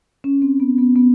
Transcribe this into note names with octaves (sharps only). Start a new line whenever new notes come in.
C#4
C4
B3
B3
B3